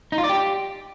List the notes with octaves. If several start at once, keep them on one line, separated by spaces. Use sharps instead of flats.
D#4
F4
D5
G4